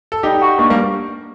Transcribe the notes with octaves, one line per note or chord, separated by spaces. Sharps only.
A4
G3 D#4 G4
F#4
A#3 D4 D#4
G3 A#3